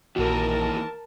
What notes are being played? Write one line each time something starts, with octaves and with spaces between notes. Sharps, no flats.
A#1 D#2 E3 F#4 A#4 A5